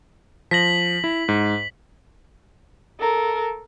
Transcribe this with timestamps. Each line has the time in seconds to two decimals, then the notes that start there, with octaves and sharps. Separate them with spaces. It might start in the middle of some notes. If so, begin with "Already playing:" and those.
0.51 F3 A#6 B6 F#7
1.04 E4
1.29 G#2
3.00 A4 A#4